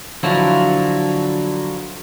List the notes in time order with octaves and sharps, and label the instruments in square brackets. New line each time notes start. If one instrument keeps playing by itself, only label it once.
[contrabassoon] D3 [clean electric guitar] F3 F#3 E4